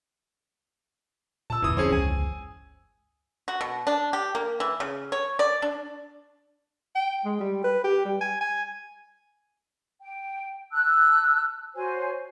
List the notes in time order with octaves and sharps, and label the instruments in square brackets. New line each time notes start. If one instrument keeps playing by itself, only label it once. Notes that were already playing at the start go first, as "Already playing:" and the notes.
[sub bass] A#2 [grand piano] A5 E6
[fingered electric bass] G1 E2 [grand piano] E3 D#6
[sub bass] F3 [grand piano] C4 C#4 G#4
[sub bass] C#2 [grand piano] G#5
[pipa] F#4
B2
D4
G4
A#3
E3
C#3
C#5
D5
D4
[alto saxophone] G5
G#3
G3
B4
G4
G3
G#5
G#5
[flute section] G5
A5 E6 F#6
F#4 C5 C#5 G#5